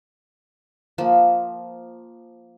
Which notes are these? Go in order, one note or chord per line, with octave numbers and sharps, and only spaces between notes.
F3 A#3